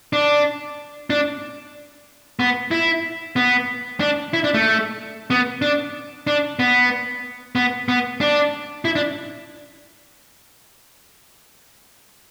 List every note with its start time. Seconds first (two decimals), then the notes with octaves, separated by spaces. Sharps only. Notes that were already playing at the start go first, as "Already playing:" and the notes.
0.13 D4
1.10 D4
2.40 B3
2.71 E4
3.36 B3
4.00 D4
4.34 E4
4.44 D4
4.54 A3
5.30 B3
5.62 D4
6.27 D4
6.59 B3
7.55 B3
7.89 B3
8.21 D4
8.85 E4
8.95 D4